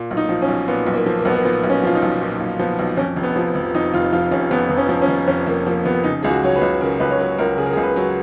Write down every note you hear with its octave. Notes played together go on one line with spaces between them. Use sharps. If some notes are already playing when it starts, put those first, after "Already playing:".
Already playing: A#2
B1
D#4
F3
C#4
B1
A#2 B3
B1
A#3
F3
A#3
B1 B3
A#3
A#2 B3
B1
C#4
F3 F4
D#4
B1
A#2
B1
F3 B3
B1
F2 C#4
F1
B3
F3
F1
F2 D#4
F1 F4
F3 F4
F1 C#4
F2 B3
F1
C#4
F3
C#4
F1
F2 C#4
F1 A#3
F3 A#3
F1 B3
C#3 D#4
C#2 G#4
F#4
F#3 C#5
B4
C#2
C#3 A#4
C#2 B4
C#5
F#3 B4
C#2 A#4
C#3 G#4
A#4
G#4
C#2
B4
F#3